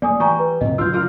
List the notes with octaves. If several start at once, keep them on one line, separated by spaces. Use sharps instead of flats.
A3 A#3 D5 G#5 D#6
E3 G4 G#5 A#5 C#6
B4
A2 C3 D#5
F#2 C#3 F#3 F4 E6 G6
F4 A#4 D5